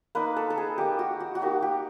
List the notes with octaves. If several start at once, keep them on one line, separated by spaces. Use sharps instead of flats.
A#3 D#4 B4
A4
A4
G#4
A#3 D#4 G4
F#4
F#4
F#4
A#3 D#4 G4
G4